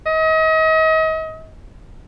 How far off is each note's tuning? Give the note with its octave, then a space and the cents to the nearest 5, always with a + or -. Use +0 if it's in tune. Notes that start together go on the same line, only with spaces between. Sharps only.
D#5 +35